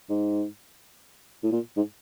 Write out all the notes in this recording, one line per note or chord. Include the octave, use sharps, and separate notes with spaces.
G#2
A2
A#2
G#2